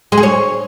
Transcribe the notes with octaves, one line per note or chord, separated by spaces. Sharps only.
G#3
G#4
C#5